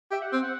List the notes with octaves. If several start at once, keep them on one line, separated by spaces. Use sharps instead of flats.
G4 E5
F#5
C4 G5
F#5